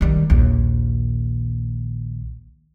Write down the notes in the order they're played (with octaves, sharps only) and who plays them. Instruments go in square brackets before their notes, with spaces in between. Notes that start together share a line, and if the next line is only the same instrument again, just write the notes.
[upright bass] D#3 G3
A#1 D#2